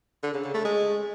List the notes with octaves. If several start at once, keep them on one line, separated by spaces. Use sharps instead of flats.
D3
C#3
C#3
A3
G#3